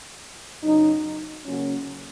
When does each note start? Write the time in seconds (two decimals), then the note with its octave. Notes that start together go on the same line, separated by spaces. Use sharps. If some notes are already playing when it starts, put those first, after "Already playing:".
0.63 F#2 C#3 F#3 D#4
1.46 C#3 F#3 A#3 C#4 F#4